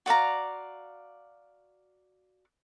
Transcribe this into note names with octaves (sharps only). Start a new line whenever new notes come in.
F#4 D5 F5 A#5